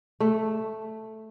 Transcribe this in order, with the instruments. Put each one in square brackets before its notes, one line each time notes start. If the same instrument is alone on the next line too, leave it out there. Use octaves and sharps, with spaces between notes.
[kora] A3